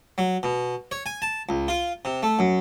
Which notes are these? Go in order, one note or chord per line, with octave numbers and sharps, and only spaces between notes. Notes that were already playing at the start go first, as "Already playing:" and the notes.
F#3
B2
C#5
G#5
A5
C#2
F4
C3
A3
F#2